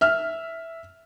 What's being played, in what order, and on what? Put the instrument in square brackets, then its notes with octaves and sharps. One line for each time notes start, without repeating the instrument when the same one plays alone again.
[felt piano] E5 F6